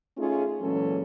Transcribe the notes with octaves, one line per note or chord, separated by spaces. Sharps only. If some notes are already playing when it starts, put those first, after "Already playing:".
A3 C#4 D#4 F4 G#4
A#2 E3 F#3 G#3 C#4 A4